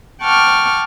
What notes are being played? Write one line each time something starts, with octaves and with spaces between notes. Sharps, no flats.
F#5 G5 A5 C#6 D6 F6